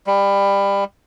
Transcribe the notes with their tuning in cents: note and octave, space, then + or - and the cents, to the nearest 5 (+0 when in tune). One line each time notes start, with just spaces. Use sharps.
G3 +25